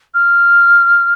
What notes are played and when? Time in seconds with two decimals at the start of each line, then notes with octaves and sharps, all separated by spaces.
0.14 F6